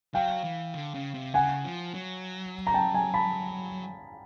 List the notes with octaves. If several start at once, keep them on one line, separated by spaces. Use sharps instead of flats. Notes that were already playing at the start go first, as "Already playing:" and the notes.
F#3 F5 G5
E3
D3
C#3
C3
C#3 F#5 G#5
F3
F#3
A#5
G5 A5
G#5 A#5
A5 B5